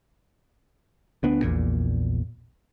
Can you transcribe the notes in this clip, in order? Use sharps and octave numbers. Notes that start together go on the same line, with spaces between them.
D2 B3 D4
A#1 E2 A#2